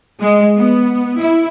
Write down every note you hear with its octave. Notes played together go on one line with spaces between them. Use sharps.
G#3
B3
E4